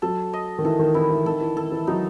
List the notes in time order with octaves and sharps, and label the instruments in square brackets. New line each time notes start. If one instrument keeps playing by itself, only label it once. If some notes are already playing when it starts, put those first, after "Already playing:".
[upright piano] F#3 [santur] A4
[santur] D#5
[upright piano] D#3
[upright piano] E3 [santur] A4
[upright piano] D#3
[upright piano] E3 [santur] E4
[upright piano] E3
[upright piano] D#3 [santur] A4
[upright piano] E3
[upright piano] D#3 [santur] A4
[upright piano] E3
[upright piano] F#3 [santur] D#4